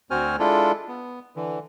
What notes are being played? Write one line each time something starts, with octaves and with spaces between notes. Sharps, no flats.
D2 C4 F#4 C5 G#5 F6
G#3 D4 E4 F4 A4
B3
D3 E3